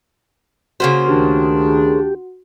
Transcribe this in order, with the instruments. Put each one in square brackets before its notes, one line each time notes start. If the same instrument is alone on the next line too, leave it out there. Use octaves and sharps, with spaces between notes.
[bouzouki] C#3 A#3 C5 [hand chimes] F#4 F#5
[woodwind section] D2 D#3 D4 [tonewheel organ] G4